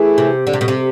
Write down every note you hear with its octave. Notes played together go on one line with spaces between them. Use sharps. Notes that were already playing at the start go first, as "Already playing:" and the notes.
Already playing: E3 A3 E4 G#4
C3
D3
C3
B2
C3